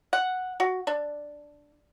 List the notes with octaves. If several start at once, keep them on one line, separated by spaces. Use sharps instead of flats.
F#5
F#4
D4